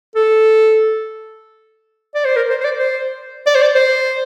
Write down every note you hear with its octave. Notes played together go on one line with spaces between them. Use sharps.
A4
D5
C5
A#4
C5
C5
D5
C5
D5
C5
D5
C5